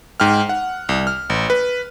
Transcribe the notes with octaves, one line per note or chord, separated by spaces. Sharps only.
G#2 G5 F6
F#5
C2
F6
A1
B4